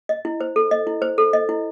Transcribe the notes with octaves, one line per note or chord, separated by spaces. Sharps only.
D#5
E4
C5
A4
D#5
E4
C5
A4
D#5
E4